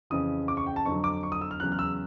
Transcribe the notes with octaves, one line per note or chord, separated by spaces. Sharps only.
F2 C#3 E3 D#6
D6
C#6
G5
A5
F2 D3 F#3 C#6
D6
C#6
D#6
E6
F6
E2 C#3 F#3 F#6
F6
E6